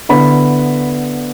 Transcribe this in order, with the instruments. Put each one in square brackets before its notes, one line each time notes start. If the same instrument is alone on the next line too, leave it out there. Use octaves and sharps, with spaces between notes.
[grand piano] D3 B3 E4 B5